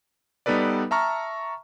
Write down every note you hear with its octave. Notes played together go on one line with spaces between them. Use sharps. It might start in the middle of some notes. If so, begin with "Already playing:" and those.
G3 B3 D#4 A4 B4 D5
E5 A5 A#5 C#6 F6